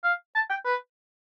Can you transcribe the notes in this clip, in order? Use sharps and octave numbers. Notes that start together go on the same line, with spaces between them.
F5
A5
G5
B4